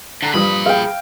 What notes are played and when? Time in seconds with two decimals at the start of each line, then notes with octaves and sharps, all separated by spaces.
0.23 D3 A#5
0.34 G2 A#2 F3 G3 B5 D#6
0.66 G#4 F5 G5